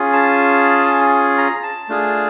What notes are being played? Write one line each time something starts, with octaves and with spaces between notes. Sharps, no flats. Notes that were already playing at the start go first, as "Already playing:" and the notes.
Already playing: C#4 F4 G#4
A5
A#5
A5
A3 D4 F4 G#4